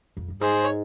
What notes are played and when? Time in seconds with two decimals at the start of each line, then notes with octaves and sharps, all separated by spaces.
0.17 F2
0.28 G2
0.41 G#2 G#4 C5
0.64 C#5